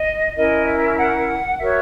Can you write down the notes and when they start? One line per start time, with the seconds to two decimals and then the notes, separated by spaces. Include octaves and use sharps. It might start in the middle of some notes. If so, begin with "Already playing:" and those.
Already playing: D#5
0.35 C#4 E4 A#4 D#5
0.66 E5
0.98 F#5
1.59 F#4 A#4 C#5 E5